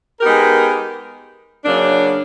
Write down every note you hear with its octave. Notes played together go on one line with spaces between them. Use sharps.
G#3 B3 D#4 G4 A#4
C#3 F#3 A#3 D4